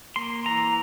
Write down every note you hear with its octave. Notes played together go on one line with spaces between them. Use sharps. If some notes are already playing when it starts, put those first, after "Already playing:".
A#3 C6
E3 A#5